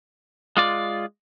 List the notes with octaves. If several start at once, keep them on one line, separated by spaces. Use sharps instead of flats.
G#3 F4 D5